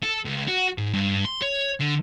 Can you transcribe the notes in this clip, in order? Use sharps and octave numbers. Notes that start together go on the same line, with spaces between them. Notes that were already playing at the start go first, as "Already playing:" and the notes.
A4
C#2
F#4
G#2
G2
C6
C#5
D3